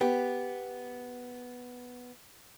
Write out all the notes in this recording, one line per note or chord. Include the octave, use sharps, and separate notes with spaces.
B3 G4